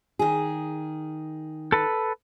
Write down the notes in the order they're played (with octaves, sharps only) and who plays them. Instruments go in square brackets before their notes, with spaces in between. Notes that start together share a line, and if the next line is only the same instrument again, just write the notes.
[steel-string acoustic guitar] D#3 G#4
[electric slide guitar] A4 B4